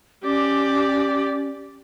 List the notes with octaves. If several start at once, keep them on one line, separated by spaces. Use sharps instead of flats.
C#4 G4 D5